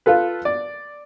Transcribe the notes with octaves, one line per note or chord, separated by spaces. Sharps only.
F4 A4 B4
D5